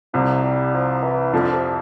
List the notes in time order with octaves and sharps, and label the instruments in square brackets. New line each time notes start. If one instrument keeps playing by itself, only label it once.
[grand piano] C2 C3 [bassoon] F3
[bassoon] G3
F3
E3
[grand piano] F2 F3 [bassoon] D3
[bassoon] C3